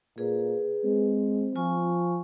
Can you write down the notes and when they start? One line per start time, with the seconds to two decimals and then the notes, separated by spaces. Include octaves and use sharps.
0.18 A#2 G#4 B4
0.84 G#3 C4
1.56 F3 F4 G#5 C#6